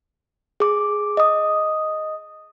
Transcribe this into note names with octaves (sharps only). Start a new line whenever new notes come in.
G#4 D6
D#5 D#6